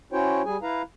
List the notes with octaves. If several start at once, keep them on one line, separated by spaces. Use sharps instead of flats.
C#4 E4 F#4 C5 C#5 G5
G3 G#4 G#5
E4 B4 F5 A#5